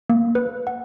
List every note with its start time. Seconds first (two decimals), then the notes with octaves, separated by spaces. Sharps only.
0.10 A#3
0.35 B4
0.67 F#5